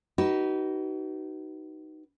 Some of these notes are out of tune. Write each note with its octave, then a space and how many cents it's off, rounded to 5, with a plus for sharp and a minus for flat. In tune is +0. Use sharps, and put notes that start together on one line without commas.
D#4 +0 F#4 +40 B4 -10